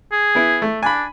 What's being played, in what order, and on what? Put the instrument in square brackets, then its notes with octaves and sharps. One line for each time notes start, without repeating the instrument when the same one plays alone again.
[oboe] G#4
[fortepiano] B3 E4
A3
[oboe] D4 [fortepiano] G#5 B5